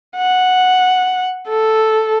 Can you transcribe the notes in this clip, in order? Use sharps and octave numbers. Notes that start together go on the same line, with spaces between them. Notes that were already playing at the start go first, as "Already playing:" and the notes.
F#5
A4